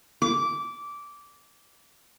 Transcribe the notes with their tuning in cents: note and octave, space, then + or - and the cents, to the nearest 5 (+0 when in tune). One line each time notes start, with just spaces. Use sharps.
D6 -15